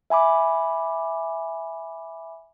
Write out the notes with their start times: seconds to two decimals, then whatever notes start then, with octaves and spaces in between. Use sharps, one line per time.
0.10 E5 G#5 B5 D6